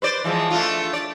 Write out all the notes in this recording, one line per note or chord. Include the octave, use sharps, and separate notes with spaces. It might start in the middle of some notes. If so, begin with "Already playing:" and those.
B4 C5 D5
E3 F3 G#3
A3 D4 F4
D5